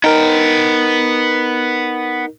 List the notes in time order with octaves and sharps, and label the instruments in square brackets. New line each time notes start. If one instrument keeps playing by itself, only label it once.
[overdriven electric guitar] B3 G5 [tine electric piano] D#4 A#4